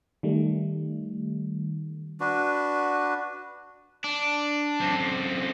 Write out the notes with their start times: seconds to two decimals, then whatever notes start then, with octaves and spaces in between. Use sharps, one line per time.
0.23 D#3 G3 A3
2.20 D4 F#4 B4
4.04 D4
4.80 F#2 C4